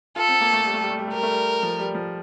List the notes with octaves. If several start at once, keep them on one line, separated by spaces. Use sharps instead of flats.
F4 A4
C4
A#3
A3
G3
A3
G3
A3
G3
A3
G3 A#4
A3
G3
F3
G3
F3